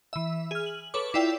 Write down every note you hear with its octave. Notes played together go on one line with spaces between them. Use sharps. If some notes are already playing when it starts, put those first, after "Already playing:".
E3 E5
G#4 F6
F#7
A4 B4 C#5 D6
E4 F4 D5 E5 G5